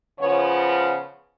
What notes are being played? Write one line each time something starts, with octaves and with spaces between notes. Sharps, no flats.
C#3 F3 B3 C#5